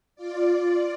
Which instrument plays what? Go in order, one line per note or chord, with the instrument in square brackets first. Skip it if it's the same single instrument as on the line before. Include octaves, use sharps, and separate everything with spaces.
[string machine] F4 D5